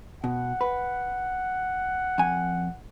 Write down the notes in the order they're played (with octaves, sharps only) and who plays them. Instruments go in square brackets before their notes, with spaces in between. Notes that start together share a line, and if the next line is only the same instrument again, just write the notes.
[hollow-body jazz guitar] B2 [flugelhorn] F#5
[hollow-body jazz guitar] B4
F2 G#5